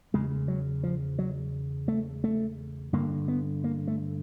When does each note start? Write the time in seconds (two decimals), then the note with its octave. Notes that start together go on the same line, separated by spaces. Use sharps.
0.14 E2 C#3 G#3
0.48 F#3
0.83 F3
1.19 F#3
1.88 A3
2.24 A3
2.93 G2 D3 A#3
3.28 B3
3.64 A#3
3.87 A3